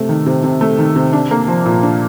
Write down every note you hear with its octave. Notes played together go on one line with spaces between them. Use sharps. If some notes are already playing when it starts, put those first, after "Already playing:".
Already playing: C3 A3
D#3
C3
C3
A3
D#3
C3
D4
A#3
F3
A#2
D4